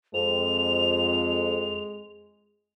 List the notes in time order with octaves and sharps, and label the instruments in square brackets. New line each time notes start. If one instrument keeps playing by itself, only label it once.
[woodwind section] F2 [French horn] G#3 [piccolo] F7